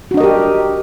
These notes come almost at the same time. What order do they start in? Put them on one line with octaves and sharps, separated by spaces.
F#4 D4 D#5 A#4 G4